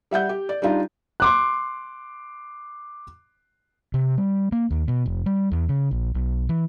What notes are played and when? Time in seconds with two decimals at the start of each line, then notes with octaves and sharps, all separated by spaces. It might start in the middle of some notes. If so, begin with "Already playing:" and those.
0.11 G3 E5 F#5 G6
0.29 G4
0.49 D5
0.62 G3 D4 D#4 F4
1.20 C6 D6 F#6
3.94 C3
4.18 G3
4.52 A#3
4.71 D#2
4.88 B2
5.06 F1
5.26 G3
5.52 E2
5.69 C#3
5.91 A#1
6.15 B1
6.49 E3